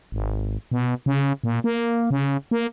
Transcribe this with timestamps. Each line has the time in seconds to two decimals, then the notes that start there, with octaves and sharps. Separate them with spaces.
0.12 G#1
0.72 B2
1.06 C#3
1.44 A#2
1.64 A#3
2.11 C#3
2.51 A#3